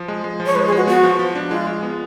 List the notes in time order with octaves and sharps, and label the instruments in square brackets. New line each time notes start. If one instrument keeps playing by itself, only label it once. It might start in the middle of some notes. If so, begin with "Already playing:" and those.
Already playing: [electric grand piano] F3
G#3
G#3
F3
[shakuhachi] C#5
[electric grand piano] G#3 [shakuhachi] B4
[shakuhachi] G#4
[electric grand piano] G#3 [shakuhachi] F#4
[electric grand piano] B3 [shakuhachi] F#4
[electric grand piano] F3
F3
D4
[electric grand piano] G#3 [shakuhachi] F4
[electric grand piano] G#3
B3